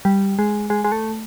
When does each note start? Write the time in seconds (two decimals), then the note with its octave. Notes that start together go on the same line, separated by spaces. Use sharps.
0.05 G3
0.39 G#3
0.70 G#3
0.85 G#3
0.92 A3